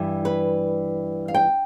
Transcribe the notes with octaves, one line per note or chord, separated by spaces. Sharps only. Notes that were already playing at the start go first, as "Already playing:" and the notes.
Already playing: G2 E3 G3
B4
F5
G5